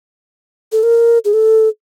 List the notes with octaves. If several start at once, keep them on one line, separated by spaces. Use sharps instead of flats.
A4
A#4
G#4
A4